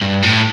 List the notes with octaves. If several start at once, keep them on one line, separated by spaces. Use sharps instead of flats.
G2
A2